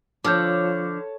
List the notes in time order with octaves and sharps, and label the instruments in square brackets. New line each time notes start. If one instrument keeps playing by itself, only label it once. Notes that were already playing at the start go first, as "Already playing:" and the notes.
[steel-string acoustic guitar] D3 [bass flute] F3 [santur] C#5 A5 [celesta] D6 F6 G6